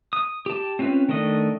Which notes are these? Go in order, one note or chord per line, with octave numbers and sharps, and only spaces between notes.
D#6
G4 A5
C4 C#4 F4 B4
D#3 A3 D4 D#5